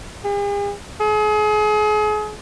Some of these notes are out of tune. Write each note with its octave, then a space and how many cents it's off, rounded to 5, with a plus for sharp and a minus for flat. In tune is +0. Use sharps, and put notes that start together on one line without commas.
G#4 -45
G#4 +35